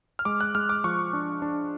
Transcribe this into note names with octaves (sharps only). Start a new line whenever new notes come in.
F6
G#3 D6
F#6
G#3 F6
D6
F3 C#6
D4
D4